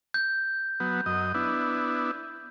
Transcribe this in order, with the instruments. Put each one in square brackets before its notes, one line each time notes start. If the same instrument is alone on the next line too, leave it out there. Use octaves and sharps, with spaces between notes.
[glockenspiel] G6
[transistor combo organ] F#3 B3
F#2 D#5
B3 D4 E4